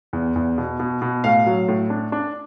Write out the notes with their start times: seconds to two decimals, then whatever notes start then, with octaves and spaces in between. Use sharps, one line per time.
0.13 E2
0.36 E2
0.58 B2
0.80 B2
1.02 B2
1.24 A2 F5
1.46 F#3
1.68 A2
1.90 D4
2.12 D4